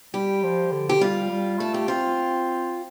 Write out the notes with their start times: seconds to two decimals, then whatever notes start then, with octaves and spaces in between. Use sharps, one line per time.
0.14 G3 G4
0.43 F3
0.72 D3
0.89 G4
1.00 G3 F4
1.30 G3
1.59 A3 A4
1.74 G4
1.88 C4 F4